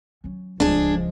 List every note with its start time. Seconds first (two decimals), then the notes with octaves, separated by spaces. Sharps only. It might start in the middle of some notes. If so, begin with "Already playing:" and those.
0.24 F#3 C#4
0.60 D1 C#2 F3 G#3 D4 G#4